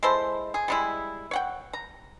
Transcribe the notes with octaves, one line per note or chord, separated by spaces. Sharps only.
G#3 E4 A4 C5
G#4
G3 G#3 E4
C#5 F#5 G5
A#5